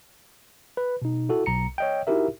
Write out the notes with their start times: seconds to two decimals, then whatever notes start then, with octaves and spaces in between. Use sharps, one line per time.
0.77 B4
1.02 B2 D#4
1.29 E4 F#4 A4
1.46 B1 A#5 C#7
1.78 C#5 D#5 G5
2.07 D#4 E4 F#4 G4 A#4 E5